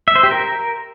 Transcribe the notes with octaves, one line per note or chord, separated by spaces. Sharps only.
E5
C5
G4
A#4